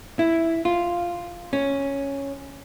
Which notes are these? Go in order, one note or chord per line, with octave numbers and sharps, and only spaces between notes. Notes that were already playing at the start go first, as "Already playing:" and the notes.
E4
F4
C#4